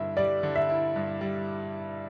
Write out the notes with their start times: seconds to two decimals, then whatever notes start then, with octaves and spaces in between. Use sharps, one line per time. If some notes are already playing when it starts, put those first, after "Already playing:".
Already playing: G2 D3 E4 E5
0.17 G3 D5
0.43 D3
0.56 E5
0.69 E4
0.96 G2
1.21 G3